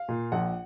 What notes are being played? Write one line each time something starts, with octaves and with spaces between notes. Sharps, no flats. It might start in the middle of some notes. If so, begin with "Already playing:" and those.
Already playing: F5
A#2
A#1 F#5